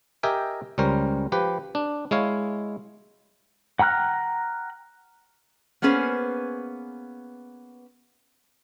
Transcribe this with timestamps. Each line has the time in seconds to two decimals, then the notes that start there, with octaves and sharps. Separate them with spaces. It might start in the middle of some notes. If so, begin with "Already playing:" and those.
0.23 G4 A#4 D#5 E5 G5 G#5
0.78 C#2 G3 C#4 A#4 C5
1.32 F3 G4 B4
1.75 D4
2.11 G#3 E4 C#5 F5
3.79 F#5 G5 A#5 F6 F#6
5.82 A#3 B3 C#4 G#4 B4 C5